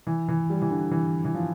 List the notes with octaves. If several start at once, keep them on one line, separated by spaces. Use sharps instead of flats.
E3
E3
G3
E3
D3
E3
E3
F3